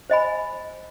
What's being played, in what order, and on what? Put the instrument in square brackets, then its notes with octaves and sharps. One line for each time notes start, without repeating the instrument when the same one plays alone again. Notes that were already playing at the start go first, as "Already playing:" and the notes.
[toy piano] C5 D#5 G#5 B5